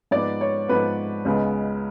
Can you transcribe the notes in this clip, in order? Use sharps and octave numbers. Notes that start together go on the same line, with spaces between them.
G#2 F3 B3 D5
C#5
G#2 F3 B3 B4
C#2 C#3 G#3 B3